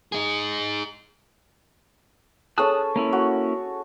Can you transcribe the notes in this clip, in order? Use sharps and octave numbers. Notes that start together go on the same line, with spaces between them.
D#4 G#4
C#4 G#4 A4 A5 D#6 F#6
A#3 C#4 E4
F#4